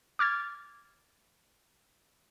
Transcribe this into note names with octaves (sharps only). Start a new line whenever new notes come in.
D6 F6 G#6 A6